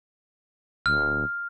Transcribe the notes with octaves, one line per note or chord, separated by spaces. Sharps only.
D1 F6